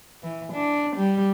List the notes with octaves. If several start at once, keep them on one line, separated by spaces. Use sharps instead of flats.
E3
D4
G3